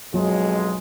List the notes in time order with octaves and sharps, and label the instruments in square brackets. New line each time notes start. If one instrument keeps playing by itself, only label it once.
[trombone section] B1 F2 G#3 [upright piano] F#3